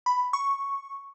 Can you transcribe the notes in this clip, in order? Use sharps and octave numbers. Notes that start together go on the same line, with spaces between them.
B5
C#6